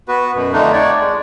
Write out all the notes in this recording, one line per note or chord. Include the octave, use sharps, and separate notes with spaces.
B3 F#4 B4
F#2 B2
F2 D3 A3 D4 D#4
C#5 D5
G#3